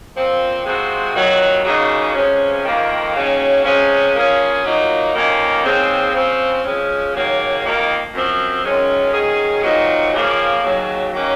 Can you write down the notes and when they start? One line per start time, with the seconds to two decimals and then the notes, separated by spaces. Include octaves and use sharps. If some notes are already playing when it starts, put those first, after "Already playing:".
0.15 A#2 F3 C4
0.65 C3 F3 G#3 C4 F#4
1.15 F2 D#3 F#3
1.65 C#3 F#3 A#3 D#4 G#4
2.15 C3 F3 G#3 C#4
2.65 F2 D#3 A#3
3.15 D#2 C#3 F#3 C#4
3.64 C3 F3 G#3 C#4
4.15 F3 A#3 C#4 G#4
4.64 A#2 F#3 A#3 D#4
5.14 F2 D#3 A#3 C#4
5.64 D#2 C#3 G#3 C4
6.13 C#3 F3 C4
6.64 F3 G#3 C#4
7.14 D#2 C#3 F#3 A#3
7.63 F2 D#3 A#3
8.13 F#2 F3 C4
8.63 F#2 D#3 G#3 C#4 F4
9.13 D#3 F#3 C#4 G#4
9.63 A#2 F#3 C4 D#4
10.12 F2 C#3 F3 A#3
10.63 D#2 C#3 F#3
11.13 D#3 F#3 A#3 C#4 F#4